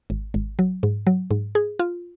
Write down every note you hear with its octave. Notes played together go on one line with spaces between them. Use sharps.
G#1
G#1
F#3
G#2
F#3
G#2
G#4
F4